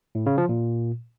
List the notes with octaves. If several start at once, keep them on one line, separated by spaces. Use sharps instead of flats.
A2
C#3
F3
A#2